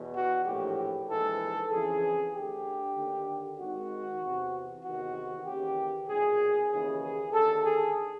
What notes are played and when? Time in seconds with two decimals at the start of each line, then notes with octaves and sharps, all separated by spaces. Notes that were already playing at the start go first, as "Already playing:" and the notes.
Already playing: E2 B2
0.15 F#4
0.46 A#1 A2 E3 G4
1.08 A#1 G#2 E3 A4
1.70 F2 C#3 E3 G#4
2.33 D2 D3 G4
2.96 D#2 D3
3.59 G#1 G#2 D#3 F#4
4.21 E2 C3 E3
4.83 E2 C3 D#3 F#4
5.45 D#2 C#3 E3 G4
6.08 B1 A#2 G#4
6.70 D#2 C#3 E3 G#4
7.02 G#4
7.32 D#2 D3 A4
7.64 G#4